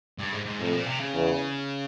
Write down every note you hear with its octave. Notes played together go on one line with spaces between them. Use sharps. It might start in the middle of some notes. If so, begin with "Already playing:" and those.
G2
G#2
G#2
F2 A2
A#2
C3
C#3
E2